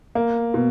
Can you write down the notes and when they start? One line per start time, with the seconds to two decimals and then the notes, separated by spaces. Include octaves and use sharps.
0.15 A#3
0.54 B2